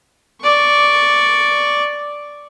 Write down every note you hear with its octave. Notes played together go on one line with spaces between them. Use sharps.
D5 C#6